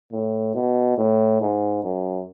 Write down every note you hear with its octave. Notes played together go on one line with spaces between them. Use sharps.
A2
B2
A2
G#2
F#2